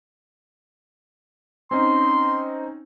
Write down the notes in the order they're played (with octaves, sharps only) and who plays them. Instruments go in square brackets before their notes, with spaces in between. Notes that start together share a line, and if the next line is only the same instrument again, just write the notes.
[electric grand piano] C4 C#4 D#4 [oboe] C6